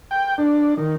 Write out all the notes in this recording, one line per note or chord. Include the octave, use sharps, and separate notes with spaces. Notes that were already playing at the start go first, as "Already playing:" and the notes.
G5
D4
D#3